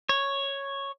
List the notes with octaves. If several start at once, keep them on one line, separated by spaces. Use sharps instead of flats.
C#5